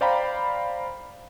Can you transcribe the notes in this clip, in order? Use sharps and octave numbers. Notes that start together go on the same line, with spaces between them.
C5 D5 F5 G5 A#5 B5